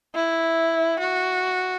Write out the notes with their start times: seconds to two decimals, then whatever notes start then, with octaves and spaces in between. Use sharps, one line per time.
0.15 E4
0.99 F#4